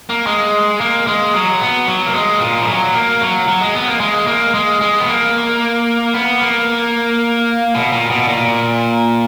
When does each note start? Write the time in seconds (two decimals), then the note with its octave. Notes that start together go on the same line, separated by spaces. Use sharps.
0.10 A#3
0.27 G#3
0.81 A#3
1.07 G#3
1.34 F#3
1.61 B3
1.87 F#3
2.06 A#3
2.14 G#3
2.40 A#2
2.61 F3
2.67 F#3
2.94 A#3
3.21 F#3
3.48 F#3
3.61 G#3
3.75 B3
3.88 A#3
4.00 G#3
4.27 A#3
4.54 G#3
4.81 G#3
5.00 B3
5.08 A#3
6.14 B3
6.42 A#3
7.75 B2
7.92 A#2
8.10 B2
8.28 A#2